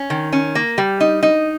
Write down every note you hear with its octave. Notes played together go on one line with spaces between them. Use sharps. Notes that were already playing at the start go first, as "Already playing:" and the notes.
Already playing: C#4
D#3
C#4
A#3
G3
D#4
D#4